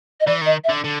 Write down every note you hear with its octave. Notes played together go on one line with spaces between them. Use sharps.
D#5
E3 D5
D#3 D#5
E5
D3
D3